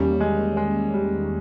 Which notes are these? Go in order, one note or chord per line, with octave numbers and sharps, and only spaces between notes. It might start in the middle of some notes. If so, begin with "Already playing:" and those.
Already playing: E2 D#3 G3 A#3 C#4
G#3
G#3
G3